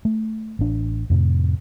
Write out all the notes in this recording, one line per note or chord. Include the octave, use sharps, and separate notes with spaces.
A3
A1 D4
F2 A2 C3